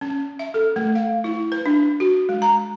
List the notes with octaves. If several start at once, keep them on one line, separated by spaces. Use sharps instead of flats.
C#4
E5
A4
A3
F5
E4
B4
D4
F#4
G#3
A#5